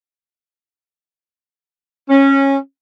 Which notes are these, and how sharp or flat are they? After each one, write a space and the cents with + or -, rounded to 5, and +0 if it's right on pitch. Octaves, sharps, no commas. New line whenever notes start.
C#4 -15